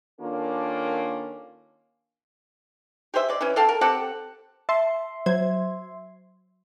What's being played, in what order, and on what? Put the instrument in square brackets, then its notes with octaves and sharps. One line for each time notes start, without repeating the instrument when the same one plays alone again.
[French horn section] D#3 A#3 C#4 D4 F4 A4
[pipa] G4 G#4 C5 E5
G#3 D5
E3 C#4
A4 F5 G5 A5
A#4
C4 G4 A4 F#5
[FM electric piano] E5 C6 [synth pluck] A5
[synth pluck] F#3 C5 G#6